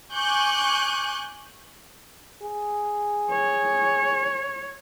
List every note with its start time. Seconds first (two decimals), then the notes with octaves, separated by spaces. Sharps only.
0.13 G#5 C#6 D6 F#6 G6
2.43 G#4
3.30 C#5